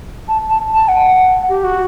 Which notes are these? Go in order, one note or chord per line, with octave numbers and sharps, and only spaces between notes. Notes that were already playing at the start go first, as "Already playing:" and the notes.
A5
A5
A5
F#5
G4
F#4